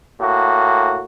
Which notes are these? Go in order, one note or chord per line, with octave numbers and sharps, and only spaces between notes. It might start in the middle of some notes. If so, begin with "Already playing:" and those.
A2 A#3 F#4